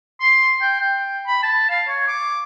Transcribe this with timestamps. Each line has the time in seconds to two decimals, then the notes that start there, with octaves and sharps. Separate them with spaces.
0.20 C6
0.61 G5
0.80 G5
1.27 B5
1.43 A5
1.70 F5
1.88 C#5
2.08 D6